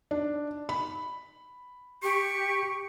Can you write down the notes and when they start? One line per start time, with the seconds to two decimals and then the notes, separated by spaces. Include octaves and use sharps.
0.11 D4
0.69 B5
2.03 G4 C#6